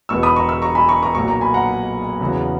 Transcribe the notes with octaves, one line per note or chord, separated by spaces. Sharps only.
E1 E2 B2 C#6 E6
B5 D#6
A#5 C#6
C#6 E6
A#5 C#6
G#5 B5
A#5 C#6
A#5 C#6
B1 A#2 F#3 A#5 C#6
A#5 C#6
G#5 B5
F#5 A#5
E2 C#3 F#3